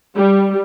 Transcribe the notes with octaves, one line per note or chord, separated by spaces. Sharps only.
G3